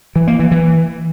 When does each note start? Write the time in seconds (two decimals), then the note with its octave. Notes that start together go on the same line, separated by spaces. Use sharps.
0.16 E3
0.28 A#3
0.39 E3
0.51 E3